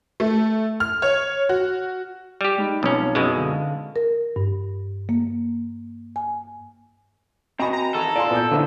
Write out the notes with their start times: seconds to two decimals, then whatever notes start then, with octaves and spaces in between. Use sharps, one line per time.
0.20 A3
0.80 F6
1.02 C#5
1.49 F#4
2.41 G3 G4
2.57 G#3 D#4 B5
2.83 B1 F3 C4 C#4
3.15 F#2 B2 G#3 E4 D#5
3.36 D3 A4 F5
3.96 A#4
4.36 G2
5.09 A#3
6.16 G#5
7.59 C4 F#4 D#5 G#5 A#5 B5
7.73 A#5
7.94 D#3 E3 G#4 A4
8.16 E4 F4 D5 F5 G#5 C6
8.31 A#2 B3 G6
8.51 F2 D3 D#3 A#3 C4 E4